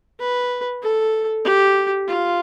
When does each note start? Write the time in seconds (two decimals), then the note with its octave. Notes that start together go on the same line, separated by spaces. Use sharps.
0.20 B4
0.83 A4
1.45 G4
2.08 F4